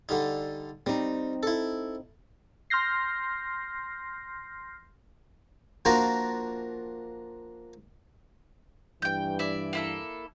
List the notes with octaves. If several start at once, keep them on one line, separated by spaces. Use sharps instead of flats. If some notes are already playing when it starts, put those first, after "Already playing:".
D3 G3 D#4
G3 C4 D#4
E4 A4
C6 F6 G6 A#6 C7
F3 A#3 D4 F4 F#4 A#4
G2 E3 G5 G6
E4 D5
A#3 E4 A4